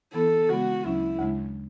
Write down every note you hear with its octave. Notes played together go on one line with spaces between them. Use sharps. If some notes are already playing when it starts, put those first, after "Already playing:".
E3 B3 E4 A4
C#3 G#3 B3 F#4
D2 C#3 F#3 C#4 E4
D2 C#3 G#3